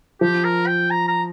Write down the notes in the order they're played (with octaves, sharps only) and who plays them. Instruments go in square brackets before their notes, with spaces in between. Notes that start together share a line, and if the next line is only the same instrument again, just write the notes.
[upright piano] F3 [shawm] G4
[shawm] A#4
G5
A#5
A#5